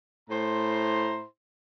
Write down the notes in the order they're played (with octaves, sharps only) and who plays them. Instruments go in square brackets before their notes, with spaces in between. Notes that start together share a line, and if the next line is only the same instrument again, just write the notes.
[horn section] A2 E4 C5 A#5 C6